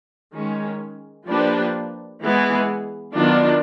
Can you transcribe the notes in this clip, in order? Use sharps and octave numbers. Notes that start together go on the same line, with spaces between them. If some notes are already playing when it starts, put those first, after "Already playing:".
D#3 G#3 C#4
F3 A#3 D4 G4 B4
E3 G#3 B3 E4 G#4
D#3 F#3 B3 D4 F4